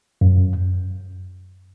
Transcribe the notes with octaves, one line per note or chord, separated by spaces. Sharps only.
F#2